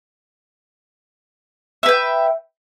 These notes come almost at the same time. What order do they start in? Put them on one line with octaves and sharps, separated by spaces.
E5 B4 G5